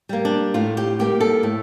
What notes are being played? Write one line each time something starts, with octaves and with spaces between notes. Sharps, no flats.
G3 A#3
D4
A2 F4
G4
G3 A#3 G4
A4
A2